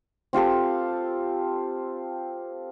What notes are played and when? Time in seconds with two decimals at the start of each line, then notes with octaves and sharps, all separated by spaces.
0.33 C4 F4 G4 A4